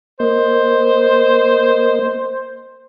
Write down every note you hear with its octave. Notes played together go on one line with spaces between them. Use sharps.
A#3 A#4 C5 D#5